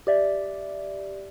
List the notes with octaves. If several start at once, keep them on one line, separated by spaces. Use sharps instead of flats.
G4 D5 E5